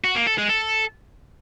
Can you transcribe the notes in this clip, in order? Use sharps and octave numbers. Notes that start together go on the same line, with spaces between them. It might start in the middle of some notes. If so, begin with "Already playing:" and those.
F#4
A#3
A4
G#3
A4